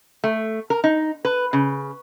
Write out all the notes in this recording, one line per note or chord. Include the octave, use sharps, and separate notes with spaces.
A3
A#4
D#4
B4
C#3